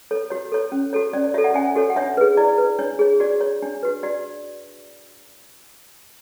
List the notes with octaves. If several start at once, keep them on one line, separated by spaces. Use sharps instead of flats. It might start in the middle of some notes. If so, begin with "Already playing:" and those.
A4 C#5
F#4 C#5
A4 C#5
C#4
F#4 A4 C#5
C#4 D5
D5
F#4 A4 C#5 E5
D5 F#5
C#4 E5 G#5
F#4 A4 C#5
F#5
D4 C#5 E5
G#4 B4
E4 D5
B4
D4 C#5
G#4 C#5
F#4 D5
C#5
D4
F#4 B4
F#4 D5